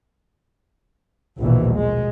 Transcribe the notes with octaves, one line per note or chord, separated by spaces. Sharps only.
A#1 D#2 B2 E3
G#3